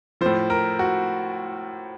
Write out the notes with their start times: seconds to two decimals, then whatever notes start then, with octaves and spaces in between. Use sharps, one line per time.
0.21 A2 F3 C5
0.50 A#4
0.79 F#4